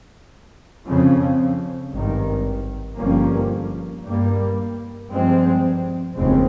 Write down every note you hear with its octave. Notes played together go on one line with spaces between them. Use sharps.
F2 C#3 F3 C4
G#1 G2 D#3
G1 G2 F3 A#3 C#4
G2 G3 A#3
G2 F3 G#3 C4
F1 D#2 C#3 G#3 C4